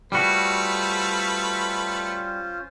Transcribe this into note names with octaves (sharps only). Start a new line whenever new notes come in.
G3 A3 C#4 F4 F#4 B4 C5